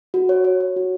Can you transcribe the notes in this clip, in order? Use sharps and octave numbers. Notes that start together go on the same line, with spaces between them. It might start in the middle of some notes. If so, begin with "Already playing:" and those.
F#4
C#5
C#5
C#5
F#4